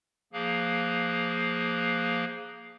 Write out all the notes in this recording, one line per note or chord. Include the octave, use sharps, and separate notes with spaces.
F3 A#3 G#4 F5 F#6